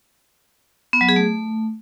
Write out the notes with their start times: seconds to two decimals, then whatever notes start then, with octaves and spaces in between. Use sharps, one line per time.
0.93 B3
1.01 F#3
1.09 G#4
1.16 A3